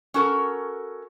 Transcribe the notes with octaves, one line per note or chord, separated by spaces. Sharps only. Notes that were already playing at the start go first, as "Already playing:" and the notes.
C#4 F#4 A4 A#4